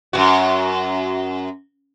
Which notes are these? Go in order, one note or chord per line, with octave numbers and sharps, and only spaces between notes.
F#2 B2 F#4